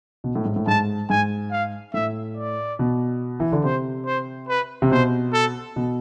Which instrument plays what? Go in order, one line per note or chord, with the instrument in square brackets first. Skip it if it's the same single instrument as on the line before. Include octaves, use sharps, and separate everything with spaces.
[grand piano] B2
A2
G#2
A2
[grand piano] G#2 [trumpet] A5
[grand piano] G#2 [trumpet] G#5
[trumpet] F5
[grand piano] A2 [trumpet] E5
[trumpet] D5
[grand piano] B2
E3
D3
[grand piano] C3 [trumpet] C5
[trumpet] C5
B4
[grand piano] C3
[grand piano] B2 [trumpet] C5
[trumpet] A4
[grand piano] B2